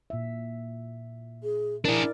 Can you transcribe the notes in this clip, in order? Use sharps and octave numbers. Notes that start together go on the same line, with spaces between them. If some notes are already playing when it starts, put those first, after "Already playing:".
A#2 E5
G#4
D4 E4 G#4 A#4 D5